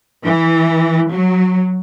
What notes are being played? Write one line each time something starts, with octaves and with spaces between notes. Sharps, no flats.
E3
F#3